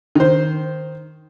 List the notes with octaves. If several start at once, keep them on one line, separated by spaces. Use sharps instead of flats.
D#3 C5